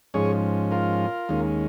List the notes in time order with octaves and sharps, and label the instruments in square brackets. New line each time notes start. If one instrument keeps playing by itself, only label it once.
[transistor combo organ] G#2 F3 C#4 G#4 C#5
F4 A#4
D#2 D#3 G#3 C#4